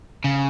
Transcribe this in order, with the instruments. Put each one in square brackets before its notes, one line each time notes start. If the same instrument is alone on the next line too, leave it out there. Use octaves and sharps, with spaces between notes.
[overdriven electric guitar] C#3